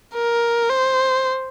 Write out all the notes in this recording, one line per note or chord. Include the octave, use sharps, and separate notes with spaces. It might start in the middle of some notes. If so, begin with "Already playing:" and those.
A#4
C5